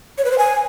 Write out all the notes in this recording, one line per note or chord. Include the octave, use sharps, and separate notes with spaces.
C#5
B4
C5
G#5